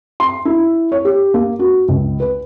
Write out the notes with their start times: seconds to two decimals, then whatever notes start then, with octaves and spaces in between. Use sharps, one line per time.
0.20 C6
0.45 E4
0.92 C#5
1.05 G4
1.34 A#3
1.59 F#4
1.89 C#2
2.20 B4